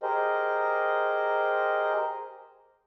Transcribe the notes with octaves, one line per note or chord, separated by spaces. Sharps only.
G4 G#4 A#4 C5 D#5